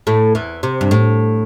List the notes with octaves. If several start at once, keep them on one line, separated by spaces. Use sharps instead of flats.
A2 A3
E2 E3
C3
G2
A2